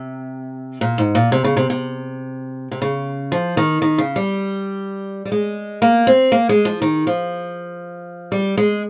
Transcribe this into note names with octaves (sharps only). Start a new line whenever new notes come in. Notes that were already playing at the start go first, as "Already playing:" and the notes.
Already playing: C3
A#2
G#2
A#2
C3
C#3
C3
C3
C3
C#3
F3
D#3
D#3
C#3
G3
G3
G#3
A#3
C4
A#3
G#3
F3
D#3
F3
G3
G#3